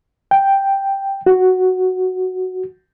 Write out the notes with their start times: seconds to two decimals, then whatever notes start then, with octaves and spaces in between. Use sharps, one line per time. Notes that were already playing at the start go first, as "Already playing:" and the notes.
0.31 G5
1.26 F#4